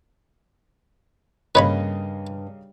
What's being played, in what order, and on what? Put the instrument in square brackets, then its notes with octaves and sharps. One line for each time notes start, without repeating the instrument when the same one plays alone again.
[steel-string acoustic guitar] G2 [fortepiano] C#3 A#3 D#5 [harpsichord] B4 C#5 B5